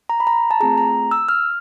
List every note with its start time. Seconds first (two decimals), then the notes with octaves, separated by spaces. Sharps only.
0.09 A#5
0.20 B5
0.27 A#5
0.51 A5
0.60 A3 C4 F4 G#4 A#5
0.78 A#5
1.11 E6
1.29 F6